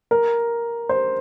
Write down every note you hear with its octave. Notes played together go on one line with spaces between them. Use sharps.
A#4
C5